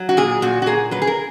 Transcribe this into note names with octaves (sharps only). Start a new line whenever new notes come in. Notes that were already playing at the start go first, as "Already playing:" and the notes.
Already playing: F#3
F#4
A#2 G#4
A#2 F#4
F#4
A#3 G#4
F#3 B4
G#4
A#4